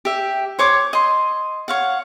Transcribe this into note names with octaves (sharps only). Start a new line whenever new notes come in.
G4 E5
C5 C#5 C#6 D6
D#5 C6
C#5 F5 F#5